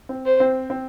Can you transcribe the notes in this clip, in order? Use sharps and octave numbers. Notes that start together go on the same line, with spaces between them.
C4
C5
C4
C4